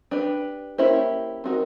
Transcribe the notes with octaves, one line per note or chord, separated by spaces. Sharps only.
D4 G4 B4
A#3 C#4 E4 G4 C5
C4 D#4 F#4 A#4